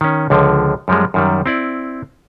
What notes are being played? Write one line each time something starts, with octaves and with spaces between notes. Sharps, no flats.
D#3 C#4
C#2 D3 F3
F#2 F3 G3 G#3
F#2 D#3 G3
C4 E4 D5